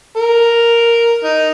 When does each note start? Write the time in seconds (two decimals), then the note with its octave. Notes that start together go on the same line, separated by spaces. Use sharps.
0.16 A#4
1.24 D#4